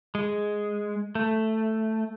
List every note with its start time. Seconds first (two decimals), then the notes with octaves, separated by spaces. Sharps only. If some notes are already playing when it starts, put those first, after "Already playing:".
0.15 G#3
1.15 A3